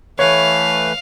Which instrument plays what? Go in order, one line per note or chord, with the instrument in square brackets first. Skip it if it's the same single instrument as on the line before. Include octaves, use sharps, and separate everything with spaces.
[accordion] E3 A3 B4 [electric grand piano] C#5 [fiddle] F5